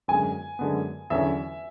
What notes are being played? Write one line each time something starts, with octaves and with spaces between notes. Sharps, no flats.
F#2 D3 G#3 B3 G#5
F#2 D3 G#3 B3
E2 D3 F#3 C#4 E4 E5